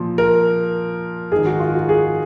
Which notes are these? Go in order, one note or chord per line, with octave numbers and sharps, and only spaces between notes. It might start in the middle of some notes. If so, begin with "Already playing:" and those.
Already playing: A#2 F3
A#4
G#2 D#3 G#4
F#4
F4
F#4
G#4